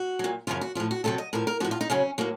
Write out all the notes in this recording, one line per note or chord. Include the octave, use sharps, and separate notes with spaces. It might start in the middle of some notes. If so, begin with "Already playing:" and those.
Already playing: F#4
A#2 F#3
F#2 C#3 F3 F4
F#4
A2 F3 F4
F#4
F2 C3 F#3 A4
D#5
A2 F3 A#4
A#4
A2 F3 F#4
F4
D#4
F#2 C#3 F#3 C#4
A2 F#3 A#3